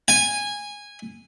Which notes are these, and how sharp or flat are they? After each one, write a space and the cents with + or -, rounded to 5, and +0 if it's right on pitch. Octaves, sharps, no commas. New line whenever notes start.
G#5 -15